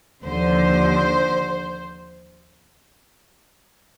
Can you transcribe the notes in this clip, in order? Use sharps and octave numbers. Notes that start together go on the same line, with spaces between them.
D#2 D3 F3 C5